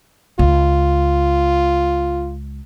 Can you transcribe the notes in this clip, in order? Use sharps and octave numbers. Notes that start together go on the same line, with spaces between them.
C#2 F4